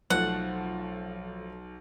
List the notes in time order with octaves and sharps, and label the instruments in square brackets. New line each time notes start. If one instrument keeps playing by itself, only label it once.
[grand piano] B1 [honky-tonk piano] F3 A3 [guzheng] F#5